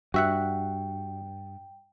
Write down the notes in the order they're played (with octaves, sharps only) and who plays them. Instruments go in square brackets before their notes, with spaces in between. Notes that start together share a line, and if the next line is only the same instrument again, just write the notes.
[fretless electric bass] G2 [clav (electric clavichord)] F#4 E5 F#5 [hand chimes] G5